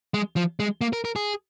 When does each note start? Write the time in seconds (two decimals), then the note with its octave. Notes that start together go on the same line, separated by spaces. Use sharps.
0.14 G#3
0.36 F3
0.60 G#3
0.81 A#3
0.93 A#4
1.05 A#4
1.16 G#4